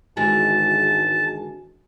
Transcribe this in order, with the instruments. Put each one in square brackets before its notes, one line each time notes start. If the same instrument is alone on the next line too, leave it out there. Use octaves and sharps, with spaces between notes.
[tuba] G#1 [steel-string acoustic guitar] D3 E3 G#3 [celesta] F#4 G#5 [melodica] A5